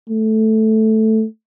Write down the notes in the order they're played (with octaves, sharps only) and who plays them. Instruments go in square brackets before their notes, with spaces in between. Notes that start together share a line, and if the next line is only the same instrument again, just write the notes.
[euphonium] A3